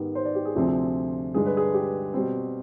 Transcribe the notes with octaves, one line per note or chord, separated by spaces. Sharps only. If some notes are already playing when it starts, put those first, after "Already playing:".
Already playing: G#2 D#3 B3 G4
C5
D5
G4
G#4
D2 C3 F3 C4
G2 D3 G#3 G#4
B4
G#4
G4
B2 G3 C4